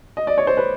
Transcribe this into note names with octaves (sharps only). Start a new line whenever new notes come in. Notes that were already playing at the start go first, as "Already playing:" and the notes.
D#5
D5
C#5
C5
B4